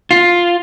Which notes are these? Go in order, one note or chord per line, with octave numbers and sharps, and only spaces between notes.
F4